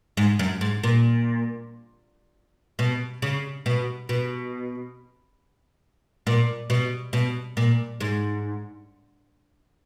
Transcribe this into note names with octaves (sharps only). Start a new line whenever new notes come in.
G#2
F#2
G#2
A#2
B2
C#3
B2
B2
A#2
B2
B2
A#2
G#2